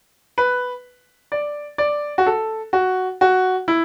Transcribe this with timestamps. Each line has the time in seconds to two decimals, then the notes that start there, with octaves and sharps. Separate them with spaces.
0.38 B4
1.32 D5
1.78 D5
2.18 F#4
2.27 A4
2.73 F#4
3.21 F#4
3.68 E4